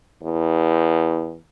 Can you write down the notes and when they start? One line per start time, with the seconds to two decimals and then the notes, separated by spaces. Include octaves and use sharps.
0.23 E2